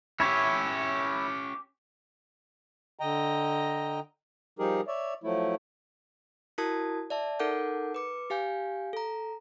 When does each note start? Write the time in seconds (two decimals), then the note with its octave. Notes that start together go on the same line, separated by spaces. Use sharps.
0.20 C#4 E4 G4 C#5 E5
2.99 D3 D#5 G5 A#5
4.59 F3 G3 D#4 G4 G#4 A#4
4.87 C#5 D5 E5
5.24 F3 F#3 A3 E4
6.58 E4 F#4 A#4 A5 D#6 G#6
7.10 D5 E5 A5
7.40 D#4 A4 A#4 F#5 D6 G6
7.94 B4 D6 C#7
8.30 G4 F5 G#5 G6
8.93 A4 A#5